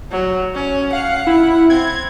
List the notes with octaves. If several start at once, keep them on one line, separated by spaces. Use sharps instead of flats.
F#3
C#4
F5 F#5
E4
C4 G#6